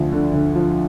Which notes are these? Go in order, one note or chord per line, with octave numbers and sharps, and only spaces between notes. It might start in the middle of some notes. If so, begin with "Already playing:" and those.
Already playing: D2 F3
D3
D3
F3